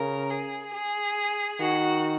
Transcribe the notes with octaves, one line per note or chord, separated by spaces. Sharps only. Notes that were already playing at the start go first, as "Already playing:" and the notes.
Already playing: C#3 A#4
G#4
G#4
D#3 F#4